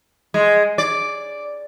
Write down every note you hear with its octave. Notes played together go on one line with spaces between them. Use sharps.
G#3
D5